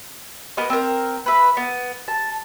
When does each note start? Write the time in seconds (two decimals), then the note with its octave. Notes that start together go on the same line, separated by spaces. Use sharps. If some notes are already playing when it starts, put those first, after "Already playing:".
0.57 A#3 B3 B4 D#5
0.70 C4 A#4
1.26 B4 E5
1.57 B3
2.08 A5